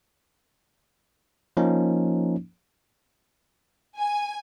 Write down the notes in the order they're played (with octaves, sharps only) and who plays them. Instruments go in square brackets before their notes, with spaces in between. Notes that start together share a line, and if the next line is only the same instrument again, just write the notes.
[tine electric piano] F3 A#3 C#4 D#4
[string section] G#5